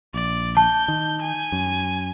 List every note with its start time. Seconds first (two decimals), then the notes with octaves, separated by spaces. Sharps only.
0.14 A#1 D5
0.57 A5 G6
0.88 D#3
1.21 G#5
1.52 F#2